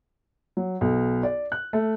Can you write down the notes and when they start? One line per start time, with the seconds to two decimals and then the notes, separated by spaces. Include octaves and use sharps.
0.57 F#3
0.81 B1
1.23 D5
1.52 F#6
1.73 A3